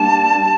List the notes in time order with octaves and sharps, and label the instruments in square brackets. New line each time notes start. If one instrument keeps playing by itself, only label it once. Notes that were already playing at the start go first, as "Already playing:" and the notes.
Already playing: [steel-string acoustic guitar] G3 A#3 D4 [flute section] A5